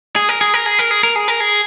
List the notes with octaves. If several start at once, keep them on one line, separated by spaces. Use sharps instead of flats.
G#4
A#4
G#4
A#4
G#4
A#4
G#4
A#4
G#4
A#4
G#4